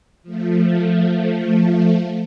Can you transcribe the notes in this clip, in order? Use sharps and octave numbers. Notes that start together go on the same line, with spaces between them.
F3 A3